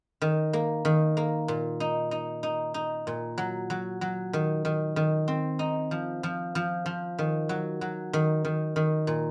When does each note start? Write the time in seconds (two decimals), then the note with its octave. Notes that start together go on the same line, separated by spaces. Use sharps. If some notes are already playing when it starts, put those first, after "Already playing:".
0.22 D#3
0.53 A#3
0.85 D#3
1.17 A#3
1.48 A#2
1.80 D#4
2.11 D#4
2.43 D#4
2.74 D#4
3.07 A#2
3.38 F#3
3.70 F#3
4.01 F#3
4.33 D#3
4.65 D#3
4.96 D#3
5.28 C4
5.59 D#4
5.91 F3
6.23 F3
6.55 F3
6.86 F3
7.19 D#3
7.49 F#3
7.81 F#3
8.13 D#3
8.45 D#3
8.76 D#3
9.07 A#2